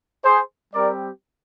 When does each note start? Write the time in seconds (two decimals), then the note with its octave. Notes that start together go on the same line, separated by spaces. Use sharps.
0.24 G#4 C5
0.74 G3 C4 G4 A#4 D5